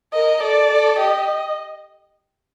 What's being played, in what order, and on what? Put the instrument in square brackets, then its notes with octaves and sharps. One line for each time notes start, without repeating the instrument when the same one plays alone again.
[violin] A#4 [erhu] D#5
[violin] A4 [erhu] D5
[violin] A4
[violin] G4 [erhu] D#5
[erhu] D#5